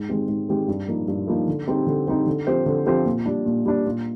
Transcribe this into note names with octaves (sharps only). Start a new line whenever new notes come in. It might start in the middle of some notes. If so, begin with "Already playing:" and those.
Already playing: G#2
D#3 G#3 C4 G4
G#2
D#3 G#3 C4 G4
G2
F3 A#3 D#4
G2
F3 A#3 D#4
D3
G3 C4 D#4 G4
D3
G3 C4 D#4 G4
D3
F3 C4 G4 C5
D3
F3 C4 G4 C5
A#2
G3 D4
A#2
G3 D4
A#2